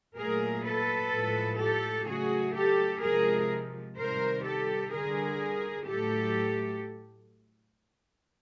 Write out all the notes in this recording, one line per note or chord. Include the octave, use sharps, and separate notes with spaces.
A#2 F#3 A3 G#4 A#4
A4 B4
A2 F3 G#3
G4 A4
C#3 F#3 A3 F#4 G#4
G4 A4
C3 F3 G#3 G#4 A#4
C3 D#3 G3 A#4 C5
G4 A4
D3 G3 G#4 A#4
A2 F#3 A3 G4 A4